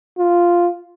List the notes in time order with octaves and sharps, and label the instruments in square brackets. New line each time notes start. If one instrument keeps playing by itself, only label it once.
[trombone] F4